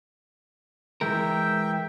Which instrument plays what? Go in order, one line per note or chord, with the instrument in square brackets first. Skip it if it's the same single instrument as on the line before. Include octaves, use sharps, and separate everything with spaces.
[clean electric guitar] E3 G#3 A#4 [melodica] E5 G5